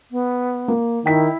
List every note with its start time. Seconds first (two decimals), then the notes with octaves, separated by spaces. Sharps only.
0.11 B3
0.68 A#3
1.06 D#3 E4 G5 B6